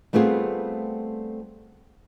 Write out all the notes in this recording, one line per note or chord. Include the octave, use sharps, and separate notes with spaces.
G3 A3 B3 C4 F4 G#4